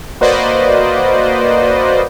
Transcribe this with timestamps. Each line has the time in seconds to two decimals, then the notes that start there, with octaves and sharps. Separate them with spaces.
0.21 A#3 F#4 B4 C5 D5 D#5